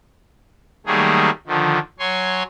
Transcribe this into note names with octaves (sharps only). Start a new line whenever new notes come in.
D#3 F#3 G3 A3 A#3 G#4
D3 D#3 F3
F#3 C#5 G#5 C6